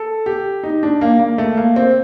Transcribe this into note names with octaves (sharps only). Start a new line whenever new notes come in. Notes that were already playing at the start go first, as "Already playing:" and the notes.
Already playing: A4
G4
D#4
D4
A#3
A#3
A3
A#3
C4